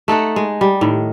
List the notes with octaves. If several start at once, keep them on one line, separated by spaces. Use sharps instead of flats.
A3 D#4 A4 F#5
G#3
G3
A2 D#3